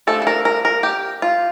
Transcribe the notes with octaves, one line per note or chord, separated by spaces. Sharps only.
F3 A3 D4 A4
A4
A#4
A#4
A#4
G4
F4